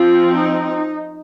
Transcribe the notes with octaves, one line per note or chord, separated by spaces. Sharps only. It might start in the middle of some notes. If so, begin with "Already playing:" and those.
Already playing: F3 C4 F4
D#4